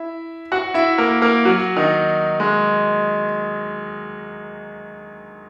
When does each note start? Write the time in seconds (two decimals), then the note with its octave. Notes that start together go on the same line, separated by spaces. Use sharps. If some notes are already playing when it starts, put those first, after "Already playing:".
Already playing: E4 E5
0.52 F#4 F#5
0.74 E4 E5
0.98 A#3 A#4
1.22 A#3 A#4
1.45 F#3 F#4
1.76 D#3 D#4
2.40 G#3